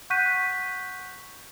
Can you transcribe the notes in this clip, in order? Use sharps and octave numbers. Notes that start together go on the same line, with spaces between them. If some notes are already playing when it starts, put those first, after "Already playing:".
F#5 C#6 F#6 G6 B6 D#7